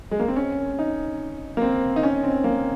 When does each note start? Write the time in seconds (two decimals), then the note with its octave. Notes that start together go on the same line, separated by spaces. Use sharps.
0.11 G#3
0.20 A#3
0.28 C4
0.36 C#4
0.79 D#4
1.57 A#3
1.62 C4
1.96 D#4
2.03 C#4
2.24 C4
2.44 A#3